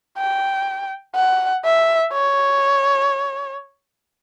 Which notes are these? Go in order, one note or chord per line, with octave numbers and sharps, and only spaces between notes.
G5
F#5
E5
C#5